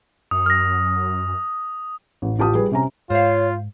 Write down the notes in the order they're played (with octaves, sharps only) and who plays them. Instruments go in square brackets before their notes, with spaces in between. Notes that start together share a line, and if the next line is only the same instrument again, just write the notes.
[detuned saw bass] F#2 [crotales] D#6
[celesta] F6 A#6
[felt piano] A1
A1 F4 G4 A5 D#6
G3 G#4 B4
C3 C#4 A#5
[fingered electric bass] G#2 [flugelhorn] F4 [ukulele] C5 F5 [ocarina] C#5